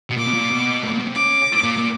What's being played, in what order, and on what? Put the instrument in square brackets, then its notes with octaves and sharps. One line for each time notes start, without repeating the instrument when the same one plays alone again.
[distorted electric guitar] B2
[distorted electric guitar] A#2 [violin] D6
[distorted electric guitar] B2
A#2
B2
A2
A#2
B2
C3
[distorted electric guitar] C#3 [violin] D6
[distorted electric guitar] A#2
A#2